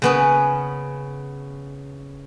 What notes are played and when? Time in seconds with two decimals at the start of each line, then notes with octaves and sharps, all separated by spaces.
0.02 C#3 B3 C#4